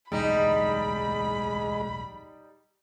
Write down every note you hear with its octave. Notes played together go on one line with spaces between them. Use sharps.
D1 B1 E2 G3 G#3 D#4 B5